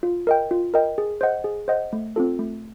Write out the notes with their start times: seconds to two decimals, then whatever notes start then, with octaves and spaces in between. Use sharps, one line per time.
0.03 F4
0.27 A#4 D#5 G5
0.51 F4
0.74 A#4 D#5 G5
0.98 G#4
1.21 C5 D#5 F#5
1.44 G#4
1.68 C5 D#5 F#5
1.93 A3
2.16 C4 F4 A4
2.39 A3